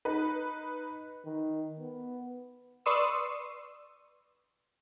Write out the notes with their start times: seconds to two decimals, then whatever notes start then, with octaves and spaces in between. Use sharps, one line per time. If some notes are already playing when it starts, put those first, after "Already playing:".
0.05 D#4 B4
1.25 D#3
1.80 B3
2.86 B4 D5 C6 C#6 D#6 E6